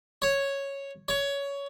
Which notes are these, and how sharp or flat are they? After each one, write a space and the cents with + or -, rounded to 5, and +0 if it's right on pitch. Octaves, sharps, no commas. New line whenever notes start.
C#5 -5
C#5 +15